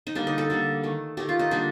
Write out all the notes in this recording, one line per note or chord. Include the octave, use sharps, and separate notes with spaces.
D#4
D3 G3 A#3 D4
D#4
A4
D3 G3 A#3
D#3 A3
D#3 A3 G4
F4
D#4
D3 G3 A#3 D4